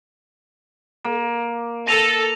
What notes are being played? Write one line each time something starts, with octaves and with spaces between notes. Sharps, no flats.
A#3
A4 A#6 D#7 F7